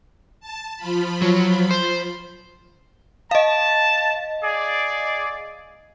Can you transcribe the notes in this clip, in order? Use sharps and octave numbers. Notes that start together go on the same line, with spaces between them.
A5
F3 F4 B5
F#3
C5
D#5 F5 A5
G#4 D5